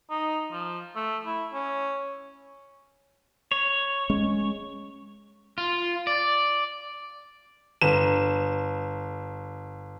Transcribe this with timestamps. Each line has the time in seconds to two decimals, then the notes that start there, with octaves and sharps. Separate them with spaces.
0.10 D#4
0.52 F3
0.96 A3
1.26 E4
1.53 C#4
3.51 C#5
4.10 G#3 C#4
5.58 F4
6.07 D5
7.81 G1 E7